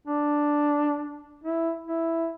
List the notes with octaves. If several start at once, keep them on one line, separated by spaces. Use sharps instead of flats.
D4
E4
E4